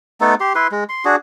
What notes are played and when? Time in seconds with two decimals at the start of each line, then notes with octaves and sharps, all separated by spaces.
0.21 A3 B3 D#4 A4
0.40 G4 C6
0.55 E4 B4 C6
0.71 G#3
0.89 C6
1.05 D4 F#4 G#4